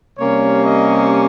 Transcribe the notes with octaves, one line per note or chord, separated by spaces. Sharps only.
C3 G3 A#3 C#4 C#5
D#5